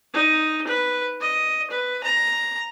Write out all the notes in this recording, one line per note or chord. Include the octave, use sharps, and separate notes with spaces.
D#4
B4
D#5
B4
A#5